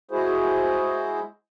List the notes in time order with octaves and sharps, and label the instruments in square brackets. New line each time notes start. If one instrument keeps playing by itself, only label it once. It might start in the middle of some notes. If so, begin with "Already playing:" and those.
[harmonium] G#3 E4 F#4 G#4 C5